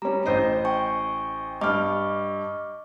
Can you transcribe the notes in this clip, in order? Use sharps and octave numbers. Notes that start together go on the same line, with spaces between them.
G3 C#4 A#5
A1 C5 D#5
G5 G#5 C#6
G2 D#5 C#6 D6 F6